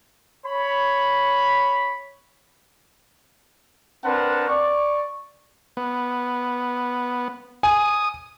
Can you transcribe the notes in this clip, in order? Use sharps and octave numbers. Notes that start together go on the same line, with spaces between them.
C#5 B5
C4 D4 A#4 B4 F#5 A5
D5 C#6
B3
G#5 D#6